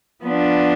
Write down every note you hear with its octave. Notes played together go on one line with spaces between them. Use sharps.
F3 B3 D4